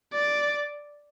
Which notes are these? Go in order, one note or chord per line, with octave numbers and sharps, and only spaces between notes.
D5